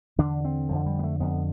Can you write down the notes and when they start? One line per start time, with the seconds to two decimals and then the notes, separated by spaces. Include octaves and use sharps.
0.18 E2 D3 D4
0.45 C4
0.69 F2 D3 F3
0.86 G3
0.99 B3
1.03 A3
1.20 F2 D3 B3